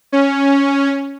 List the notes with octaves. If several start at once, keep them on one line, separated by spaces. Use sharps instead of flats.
C#4